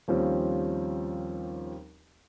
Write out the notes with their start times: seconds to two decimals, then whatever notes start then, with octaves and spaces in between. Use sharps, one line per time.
0.08 D#2 F3 G3 C4 C#4